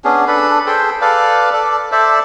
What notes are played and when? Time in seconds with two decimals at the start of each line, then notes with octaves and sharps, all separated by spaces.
0.05 B3 C#4 D4 G#4
0.28 D4 A4 B4 B5
0.67 G#4 A4 C5 G5
1.01 A4 B4 D5 F5
1.53 A4 D5
1.92 A4 C5 D5 E5